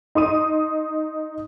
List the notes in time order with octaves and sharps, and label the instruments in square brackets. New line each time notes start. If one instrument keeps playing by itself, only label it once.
[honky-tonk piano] D#4 C6 D#6 D#7